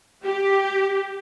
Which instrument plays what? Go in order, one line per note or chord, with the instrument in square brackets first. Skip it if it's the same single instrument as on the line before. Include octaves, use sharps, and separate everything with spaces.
[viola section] G4